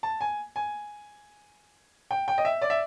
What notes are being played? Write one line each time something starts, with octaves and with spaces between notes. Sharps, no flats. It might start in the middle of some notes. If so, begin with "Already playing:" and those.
A5
G#5
G#5
G5
G5
D#5
E5
D5
E5